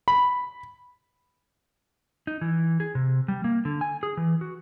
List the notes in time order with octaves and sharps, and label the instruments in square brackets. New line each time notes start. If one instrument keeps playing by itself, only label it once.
[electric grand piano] B5
[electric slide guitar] D#4
E3
G#4
C3
G3
A#3
D3
G#5
G#4
E3
F#4